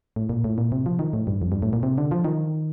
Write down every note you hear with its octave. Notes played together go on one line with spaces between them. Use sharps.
A2
A#2
A2
A#2
C3
F3
D#3
A2
G2
F2
G2
A2
A#2
C3
D3
F3
D#3